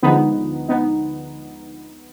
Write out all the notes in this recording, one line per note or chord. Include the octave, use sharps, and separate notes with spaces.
D2 D3 F3 G#3 B3 D#4
B3 D#4